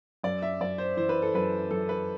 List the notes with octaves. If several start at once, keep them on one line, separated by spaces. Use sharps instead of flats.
F#2 D5
E5
F#2 D5
C5
E3 C5
B4
A4
F#2 B4
F#2 A4
B4